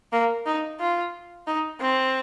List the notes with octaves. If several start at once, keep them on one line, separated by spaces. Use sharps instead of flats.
A#3
D#4
F4
D#4
C4